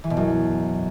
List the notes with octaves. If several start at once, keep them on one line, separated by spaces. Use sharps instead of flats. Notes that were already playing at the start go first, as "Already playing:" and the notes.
E3
B2
F#2